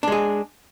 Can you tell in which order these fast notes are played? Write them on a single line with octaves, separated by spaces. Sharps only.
D4 G#3 G#4